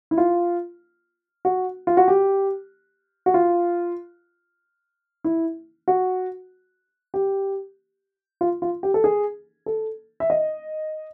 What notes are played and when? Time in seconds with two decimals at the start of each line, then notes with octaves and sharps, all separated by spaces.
0.11 E4
0.18 F4
1.45 F#4
1.87 F4
1.97 F#4
2.08 G4
3.26 F#4
3.34 F4
5.24 E4
5.88 F#4
7.14 G4
8.41 F4
8.62 F4
8.83 G4
8.94 A4
9.04 G#4
9.66 A4
10.20 E5
10.30 D#5